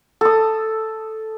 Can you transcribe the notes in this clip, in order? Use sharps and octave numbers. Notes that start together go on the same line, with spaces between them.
A4 D#6